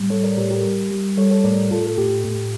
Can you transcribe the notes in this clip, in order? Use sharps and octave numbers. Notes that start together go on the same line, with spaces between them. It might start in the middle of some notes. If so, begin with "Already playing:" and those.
Already playing: A2 G3
G3 A4 C#5
A#4 D5
A2 G4 A#4
G4 A#4
G3
G3
G3 A4 C#5
A4 C#5
A2 A#4 D5
A2 F4 A4
A4
A2 G4
A2 G4